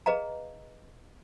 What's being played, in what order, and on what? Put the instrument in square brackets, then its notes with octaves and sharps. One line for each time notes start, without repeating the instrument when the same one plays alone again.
[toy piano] G#4 B4 D#5 F5 A#5